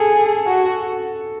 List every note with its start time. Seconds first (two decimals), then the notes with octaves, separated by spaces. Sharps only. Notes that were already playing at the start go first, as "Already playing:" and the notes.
Already playing: G#4 A4
0.47 F#4